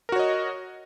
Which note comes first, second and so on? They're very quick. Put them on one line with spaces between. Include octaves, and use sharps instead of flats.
A#4 F#4 C#5 D#5